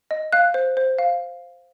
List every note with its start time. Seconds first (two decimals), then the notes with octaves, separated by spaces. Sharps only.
0.11 D#5
0.33 F5 F#6
0.54 C5
0.77 C5
0.98 F5